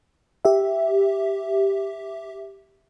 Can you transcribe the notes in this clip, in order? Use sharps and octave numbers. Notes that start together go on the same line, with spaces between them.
G4 E5